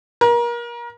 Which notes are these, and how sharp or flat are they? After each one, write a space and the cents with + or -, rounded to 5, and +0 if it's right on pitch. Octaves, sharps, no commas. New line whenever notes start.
A#4 +30